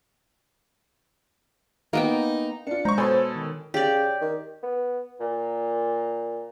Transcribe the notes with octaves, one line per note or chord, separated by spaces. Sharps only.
A#3 B3 D#4 G5
D4 F4 C#7
G#3 C5 A#5 C#6
B2 A4 C#5 G#5 B5 C6
D#3
C#3 G4 D5
D#3
B3
A#2